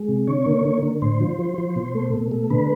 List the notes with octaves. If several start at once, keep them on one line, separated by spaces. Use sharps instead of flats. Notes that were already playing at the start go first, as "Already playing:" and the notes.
Already playing: G#3
C3
D3 C#5
A#3
D3
D3
A2 C5
F3
F3
F3
B2
A3
B2
A3
D3 B4